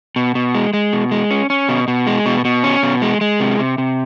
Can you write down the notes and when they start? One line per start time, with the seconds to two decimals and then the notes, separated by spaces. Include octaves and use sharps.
0.16 B2
0.35 B2
0.55 G#3
0.73 G#3
0.93 B2
1.11 G#3
1.31 C#4
1.50 C#4
1.69 B2
1.88 B2
2.07 G#3
2.26 B2
2.45 B2
2.64 C#4
2.83 B2
3.02 G#3
3.21 G#3
3.40 C3
3.59 C3
3.78 C3